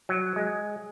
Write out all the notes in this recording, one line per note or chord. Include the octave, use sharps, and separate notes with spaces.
F#3
G#3